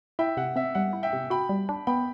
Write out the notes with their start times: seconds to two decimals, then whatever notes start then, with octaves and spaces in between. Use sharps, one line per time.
0.19 E4 E5 G5
0.37 C3 F#5
0.56 C4 E5
0.75 G3 F#5
0.93 E4
1.03 E5 G5
1.13 C3
1.30 F#4 G5 B5
1.49 G3
1.69 D4
1.87 B3 G5 B5